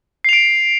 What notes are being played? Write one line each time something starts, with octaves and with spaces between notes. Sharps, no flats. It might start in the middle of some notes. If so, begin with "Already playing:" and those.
C7 D7 F7